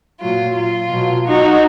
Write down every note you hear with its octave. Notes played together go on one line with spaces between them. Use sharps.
A#2 F#3 F4
F4
B2 F#3
D#4 F#4